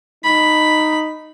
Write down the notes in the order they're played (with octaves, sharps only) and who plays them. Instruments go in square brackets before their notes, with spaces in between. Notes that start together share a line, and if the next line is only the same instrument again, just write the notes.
[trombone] D#4 [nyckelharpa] B5